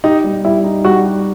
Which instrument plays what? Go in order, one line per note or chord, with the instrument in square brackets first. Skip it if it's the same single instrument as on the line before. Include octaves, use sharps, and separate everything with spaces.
[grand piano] D#4 [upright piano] G4
[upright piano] G3
[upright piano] G3 [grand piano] E4
[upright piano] D#4
[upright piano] G3 [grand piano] F#4
[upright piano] G4